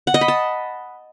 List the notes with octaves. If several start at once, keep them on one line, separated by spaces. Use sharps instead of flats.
F#5
D#5
B5
A5